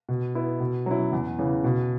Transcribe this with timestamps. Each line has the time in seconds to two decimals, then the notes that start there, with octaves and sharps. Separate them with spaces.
0.09 B2
0.35 B3 E4
0.60 B2
0.86 F#3 C#4 E4
1.12 E2
1.38 C#3 E3
1.64 B2